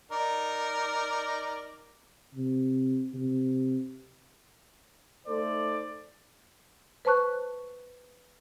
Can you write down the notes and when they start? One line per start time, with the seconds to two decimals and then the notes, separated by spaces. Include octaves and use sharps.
0.11 D#4 A#4 D5
2.35 C3
3.14 C3
5.27 A3 D#4 A4 C5 D5
7.05 B4 C5 A5 C#6 F#6